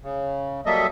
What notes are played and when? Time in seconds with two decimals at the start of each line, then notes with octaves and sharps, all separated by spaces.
0.03 C#3
0.66 F#3 G3 A#3 A4 D#5 E5